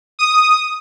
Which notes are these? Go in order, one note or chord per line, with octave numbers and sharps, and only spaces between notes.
D#6